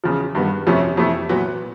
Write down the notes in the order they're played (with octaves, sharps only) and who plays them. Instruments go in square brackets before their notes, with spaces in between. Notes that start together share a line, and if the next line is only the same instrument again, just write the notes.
[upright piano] E2 C#3 F3
G2 D#3 G3 B3
F2 C3 F3 A3 C#4
F2 C3 E3 A3
A#2 F#3 B3